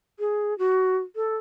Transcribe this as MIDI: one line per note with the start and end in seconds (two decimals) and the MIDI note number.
0.19 0.57 68
0.59 0.97 66
1.16 1.37 69